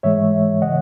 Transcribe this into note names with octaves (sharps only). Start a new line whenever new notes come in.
G#2 E3 G#3 C#5 E5
C#3 E3 D#5 F#5